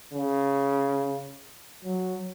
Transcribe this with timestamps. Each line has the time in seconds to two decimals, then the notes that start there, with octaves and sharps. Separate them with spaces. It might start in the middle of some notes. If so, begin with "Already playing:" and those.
0.14 C#3
1.84 F#3